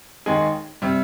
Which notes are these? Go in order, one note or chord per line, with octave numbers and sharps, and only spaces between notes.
D#2 D#3 G#3 D#4 G#4
C3 G3